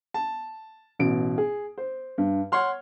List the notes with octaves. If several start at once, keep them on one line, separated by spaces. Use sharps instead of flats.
A5
A1 B2 D7
G#4
C5
G2
C#5 F#5 C6 F6